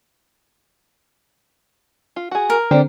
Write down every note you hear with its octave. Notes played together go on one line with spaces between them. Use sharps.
F4
F#4 G#4
A#4
D3 C4 G4 C5 D5